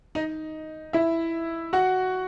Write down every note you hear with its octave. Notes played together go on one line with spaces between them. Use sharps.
D#4 D#5
E4 E5
F#4 F#5